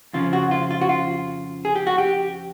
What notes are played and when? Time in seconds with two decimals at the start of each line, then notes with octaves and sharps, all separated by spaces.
0.13 F2 C#3 F3 F4
0.33 F#4
0.51 F4
0.71 F4
0.81 F#4
0.89 F4
1.65 G#4
1.76 G4
1.87 F#4
1.98 G4